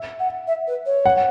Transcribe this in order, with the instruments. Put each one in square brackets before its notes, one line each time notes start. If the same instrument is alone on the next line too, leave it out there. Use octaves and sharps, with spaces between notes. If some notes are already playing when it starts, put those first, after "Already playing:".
Already playing: [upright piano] E5
[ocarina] F#5
E5
B4
C#5
[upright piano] F#5